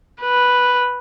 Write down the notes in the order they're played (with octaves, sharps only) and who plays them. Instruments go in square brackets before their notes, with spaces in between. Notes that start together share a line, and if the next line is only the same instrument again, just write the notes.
[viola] B4